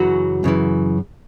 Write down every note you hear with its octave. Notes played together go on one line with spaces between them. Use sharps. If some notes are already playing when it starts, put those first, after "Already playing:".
Already playing: F#2 C#3 E3 F#3 F#4
F#2 C#3 E3